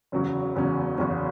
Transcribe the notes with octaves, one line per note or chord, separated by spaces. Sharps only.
F#1 E2 C#3 F#3 C#4
F#1 E2 C#3 F#3 C#4
F#1 E2 C#3 F#3 C#4